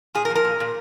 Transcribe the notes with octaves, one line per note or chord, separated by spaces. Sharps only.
A#2 G#4
A#4
F3
A#4
A#2
A#2